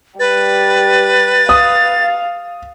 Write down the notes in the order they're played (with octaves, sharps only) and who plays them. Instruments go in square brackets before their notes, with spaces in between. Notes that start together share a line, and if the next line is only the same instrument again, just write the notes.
[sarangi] G3 [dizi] B4 [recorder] A6
[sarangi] F5 [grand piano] D#6